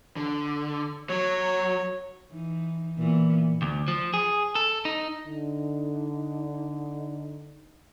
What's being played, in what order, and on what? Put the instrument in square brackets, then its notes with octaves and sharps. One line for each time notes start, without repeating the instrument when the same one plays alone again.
[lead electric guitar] D3
[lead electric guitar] F#3 [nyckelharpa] C#5
[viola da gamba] E3 D#4
A#2 E3 B3
[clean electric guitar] D2
F3
G#4
A4
D#4
[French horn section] D3 D#4